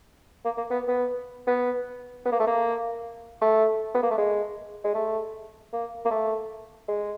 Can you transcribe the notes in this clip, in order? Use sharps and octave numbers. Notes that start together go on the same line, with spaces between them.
A#3
A#3
B3
B3
B3
B3
A#3
A3
A#3
A3
B3
A#3
A3
G#3
G#3
A3
A#3
A#3
A3
G#3